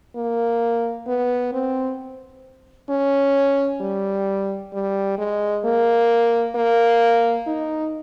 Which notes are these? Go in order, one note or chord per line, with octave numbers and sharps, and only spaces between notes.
A#3
B3
C4
C#4
G3
G3
G#3
A#3
A#3
D#4